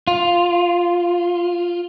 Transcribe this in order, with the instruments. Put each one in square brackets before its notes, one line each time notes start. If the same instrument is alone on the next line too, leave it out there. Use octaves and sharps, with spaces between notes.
[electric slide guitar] F4